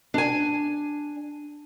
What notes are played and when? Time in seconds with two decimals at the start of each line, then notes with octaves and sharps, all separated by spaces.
0.14 D4 G#5